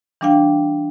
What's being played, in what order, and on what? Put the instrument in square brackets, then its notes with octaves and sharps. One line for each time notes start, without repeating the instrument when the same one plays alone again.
[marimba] E3 G3 D4 F5 G5